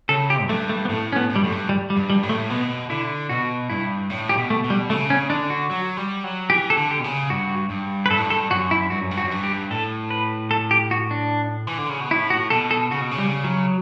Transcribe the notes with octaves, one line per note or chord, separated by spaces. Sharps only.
C#3 A4
G4
F#2
G2 A3
A3
B3
A2 A3
C#4
B3
A2
G2 G3
F#2 A3
G2
G3
G3
G2
G3
A2
A3
B2 B3
D3 E4
B2 F#4
G2 E4
A2
G4
B2
A3
B2
G3
C#3 A3
C#4
D3 D4
F#4
F#3
G3
F#3
E3 G4
A4
D3
G4
B2
C#3
G2 F#4
G2
B4
G2 A4
A2
G2
A4
F#2 F#4
E4
G2 F#4
F#2
G2
F#4
F#2
G2
G4
A2 A4
B4
A4
G4
F#4
D4
E3
D3
C#3
B2
A2 E4
F#4
B2 A4
A4
C#3 F#4
B2
C#3
G3
F#3